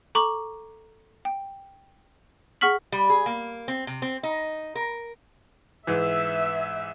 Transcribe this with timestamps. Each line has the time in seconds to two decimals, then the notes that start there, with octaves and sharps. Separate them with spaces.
0.15 A4 A#5 C#6 D6 F#7
1.25 G5
2.61 G#4 F#5 C#6 F6 B6 F#7
2.92 G3
3.10 G#4
3.26 A#3
3.68 C4
3.87 C3
4.02 C4
4.23 D#4
4.75 A#4
5.87 G#2 E3 B4 E5